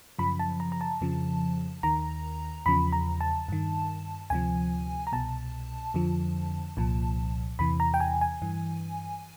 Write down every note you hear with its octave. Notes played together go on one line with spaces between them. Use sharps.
F#2 C#3 F3 B5
A5
A#5
A#5
A5
F2 C#3 F3
D#2 D#3 A#5
E2 C#3 F3 B5
A#5
A5
G2 D#3
D2 C3 F3 G#5
A#5
C2 B2 A5
F2 D3 F3
C2 A#2 F3
E2 C3 E3 B5
A#5
G5
G#5
G#5
G2 E3